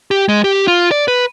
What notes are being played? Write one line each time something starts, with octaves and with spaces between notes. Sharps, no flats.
G4
G#3
G4
F4
D5
B4